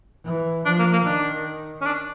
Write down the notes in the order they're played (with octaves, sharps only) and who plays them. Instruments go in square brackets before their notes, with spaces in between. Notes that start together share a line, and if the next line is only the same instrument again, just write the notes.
[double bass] E3
[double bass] F3 [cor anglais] D4
[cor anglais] A#3
A#3
[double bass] D#3 [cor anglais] D4
[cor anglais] C#4
D4